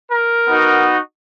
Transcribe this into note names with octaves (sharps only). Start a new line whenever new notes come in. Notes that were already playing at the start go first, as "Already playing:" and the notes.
A#4
B3 D#4 F#4